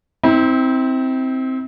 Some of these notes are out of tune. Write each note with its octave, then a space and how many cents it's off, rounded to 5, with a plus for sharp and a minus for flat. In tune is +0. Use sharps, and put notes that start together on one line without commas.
C4 +0 E4 -40